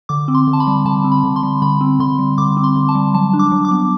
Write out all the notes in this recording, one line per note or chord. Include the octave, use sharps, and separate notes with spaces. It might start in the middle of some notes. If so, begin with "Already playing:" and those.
D3 D6
C4
C6
D3
A5
B5
G3
D3 A5
C4
B5
D3
C6
G3
D3 B5
C4
D3 C6
G3
D3 D6
C4
C6
D3
A5
G3
F#3 A5
D4
D6
F#3
D6
B3